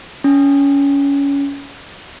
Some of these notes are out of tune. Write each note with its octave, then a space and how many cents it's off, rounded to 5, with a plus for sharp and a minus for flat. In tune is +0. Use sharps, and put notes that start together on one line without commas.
C#4 +20